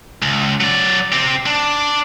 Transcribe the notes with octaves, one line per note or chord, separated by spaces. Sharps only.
C#2
F#3 D5
C4 G4
D4